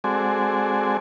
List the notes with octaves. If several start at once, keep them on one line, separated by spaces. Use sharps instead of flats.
G#3 C4 F#4 A4 D5 G#5